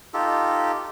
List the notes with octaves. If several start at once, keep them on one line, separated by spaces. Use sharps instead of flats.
D#4 F4 G4 A4